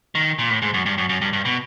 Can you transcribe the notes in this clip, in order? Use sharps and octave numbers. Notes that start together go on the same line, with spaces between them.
D#3
A#2
A2
G#2
F#2
G2
F#2
F#2
G2
G2
B2